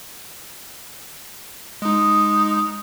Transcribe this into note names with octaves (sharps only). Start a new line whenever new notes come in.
G#3 D#4 D#6